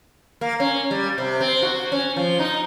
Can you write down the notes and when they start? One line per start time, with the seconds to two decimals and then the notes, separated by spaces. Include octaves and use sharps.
0.41 A#3
0.60 C#4
0.91 G3
1.18 C3
1.40 C4
1.62 F#4
1.92 C#4
2.16 F3
2.39 D#4